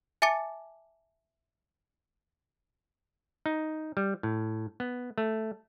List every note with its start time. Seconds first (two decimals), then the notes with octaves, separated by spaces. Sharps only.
0.22 E5 G#5 A5 D6 A6 C#7
3.46 D#4
3.97 G3
4.23 A2
4.80 B3
5.18 A3